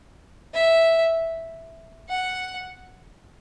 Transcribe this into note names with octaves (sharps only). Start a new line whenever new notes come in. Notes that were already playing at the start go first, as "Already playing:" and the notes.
E5
F#5